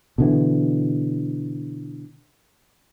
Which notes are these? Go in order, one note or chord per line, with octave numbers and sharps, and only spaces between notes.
B2 D3 E3